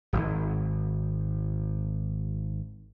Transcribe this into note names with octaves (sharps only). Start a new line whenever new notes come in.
D#1 G#1